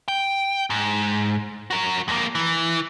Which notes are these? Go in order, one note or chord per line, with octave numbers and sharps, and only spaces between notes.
G5
G#2
F#4 A#4
F2 A#3
E3